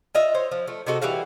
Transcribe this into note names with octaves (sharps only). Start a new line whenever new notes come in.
F4 D#5 E5
C5 C#5
F3
F3 A3
C3 D#4 F#4 A4
E3 G3 F#4 F5